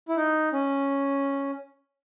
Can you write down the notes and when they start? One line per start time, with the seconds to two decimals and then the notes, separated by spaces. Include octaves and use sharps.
0.09 E4
0.16 D#4
0.53 C#4